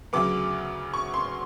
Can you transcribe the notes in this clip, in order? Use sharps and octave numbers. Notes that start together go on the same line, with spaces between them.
D2 C#3 F#3 B3 D6
C#6
C6